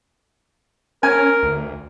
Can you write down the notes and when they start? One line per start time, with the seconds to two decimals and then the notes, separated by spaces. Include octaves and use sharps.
1.03 C#4 A#4 G#5
1.43 D2